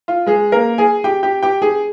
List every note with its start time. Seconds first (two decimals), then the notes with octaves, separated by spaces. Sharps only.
0.08 F4
0.26 G#3 G#4
0.52 A#3 A#4
0.78 G#4 G#5
1.04 G4 G5
1.23 G4 G5
1.43 G4 G5
1.62 G#4 G#5